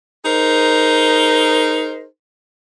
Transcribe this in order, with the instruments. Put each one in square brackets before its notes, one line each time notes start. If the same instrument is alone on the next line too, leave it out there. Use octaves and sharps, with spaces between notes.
[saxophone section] D#4 G#4 A#4 C5